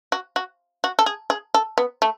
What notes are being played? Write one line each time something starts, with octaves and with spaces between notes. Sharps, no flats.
F#4
F#4
F#4
A4
G#4
G#4
A4
B3
A3